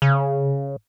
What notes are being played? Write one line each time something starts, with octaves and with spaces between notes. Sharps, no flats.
C#3